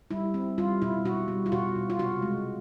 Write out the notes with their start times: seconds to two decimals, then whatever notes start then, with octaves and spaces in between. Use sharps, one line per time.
0.11 G3 E4
0.34 C4
0.58 G3 F4
0.82 B2 E4
1.05 B2 F#4
1.28 G3
1.46 F4
1.52 B2 F#4
1.75 B2
1.90 F4
1.99 C3 F#4
2.22 G#3